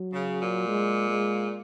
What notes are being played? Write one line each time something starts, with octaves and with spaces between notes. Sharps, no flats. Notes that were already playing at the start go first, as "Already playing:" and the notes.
Already playing: F#3
C#3
A#2
G#3
G#3